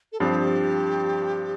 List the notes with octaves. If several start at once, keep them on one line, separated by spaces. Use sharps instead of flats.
A4
G2 F3 C4 G4